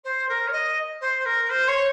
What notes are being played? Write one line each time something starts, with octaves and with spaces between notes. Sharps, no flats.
C5
A#4
C#5
D#5
C5
A#4
C5
C#5